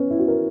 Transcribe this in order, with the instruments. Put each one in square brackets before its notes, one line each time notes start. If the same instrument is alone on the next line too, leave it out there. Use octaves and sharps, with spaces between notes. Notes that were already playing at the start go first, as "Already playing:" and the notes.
Already playing: [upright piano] B3 C#4
E4
F#4
A#4